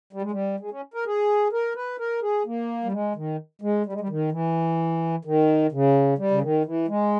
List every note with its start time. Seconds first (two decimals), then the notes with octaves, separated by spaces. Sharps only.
0.13 G3
0.22 G#3
0.31 G3
0.59 G#3
0.71 C#4
0.94 A#4
1.06 G#4
1.52 A#4
1.76 B4
1.99 A#4
2.22 G#4
2.46 A#3
2.84 G3
2.92 G#3
3.16 D#3
3.62 G#3
3.86 G3
3.93 G#3
4.00 G3
4.09 D#3
4.32 E3
5.25 D#3
5.72 C#3
6.18 G3
6.31 C#3
6.42 D#3
6.65 E3
6.88 G#3